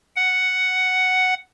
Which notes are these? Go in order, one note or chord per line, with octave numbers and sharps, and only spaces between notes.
F#5